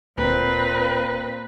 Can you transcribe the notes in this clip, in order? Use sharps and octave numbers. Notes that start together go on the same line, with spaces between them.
D1 A#2 A#3 C4 B4